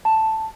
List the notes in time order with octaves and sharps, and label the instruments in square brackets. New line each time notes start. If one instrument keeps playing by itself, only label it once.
[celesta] A5